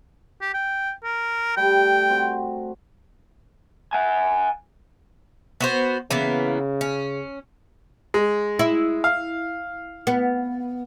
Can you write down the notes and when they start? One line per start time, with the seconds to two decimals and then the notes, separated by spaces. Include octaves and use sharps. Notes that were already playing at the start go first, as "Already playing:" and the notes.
0.42 G4
0.54 G5
1.04 A#4
1.57 G3 A3 G5
2.10 C4 F#4
3.93 F#5 G#5
5.60 B3 F#4 C5
6.11 C#3 E3 A#3 B3
6.81 C#4
8.14 G#3
8.59 E4
9.04 F5
10.07 B3